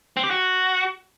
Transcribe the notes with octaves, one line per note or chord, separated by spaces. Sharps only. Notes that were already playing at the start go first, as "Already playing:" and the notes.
C4
G4
F#4